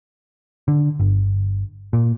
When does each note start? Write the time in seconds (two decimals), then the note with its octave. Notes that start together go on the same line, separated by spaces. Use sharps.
0.68 D3
1.00 G1
1.93 A#2